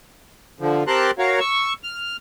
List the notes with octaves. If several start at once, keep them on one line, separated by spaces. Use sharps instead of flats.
D3 F3
C4 G4 A#4 A5 C6 F#6
F#4 A#4 C#5 F5
C#6 E6
F6